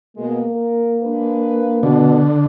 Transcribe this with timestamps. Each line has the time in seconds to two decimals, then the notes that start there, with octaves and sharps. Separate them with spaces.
0.17 B2 G#3 A#3
0.51 A#4
1.01 G#3 D4 B4
1.83 B2 D3